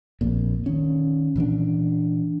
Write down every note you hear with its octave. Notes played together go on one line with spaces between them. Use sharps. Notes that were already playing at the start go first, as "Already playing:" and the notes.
A#1 F2 A#2
D#3 C#4
A#2 E3 C4 D4